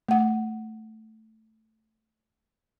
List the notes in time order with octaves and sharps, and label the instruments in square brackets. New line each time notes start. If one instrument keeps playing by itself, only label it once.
[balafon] A3 F#5